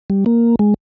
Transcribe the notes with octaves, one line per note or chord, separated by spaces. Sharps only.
G3
A#3
G#3